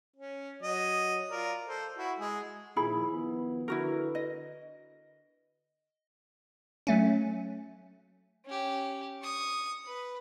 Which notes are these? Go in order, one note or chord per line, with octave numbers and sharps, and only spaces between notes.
C#4
F#3 D#5
F4 A#4 D5
A4 C5
E4 F#4
G#3 G#4
A#2 D#3 F3 E4 G#4 B5
D#3 F3 B3
D3 E4 F#4 A#4 B4
D#5
F#3 A3 C#4
C#4 G4
C#6 D#6
B4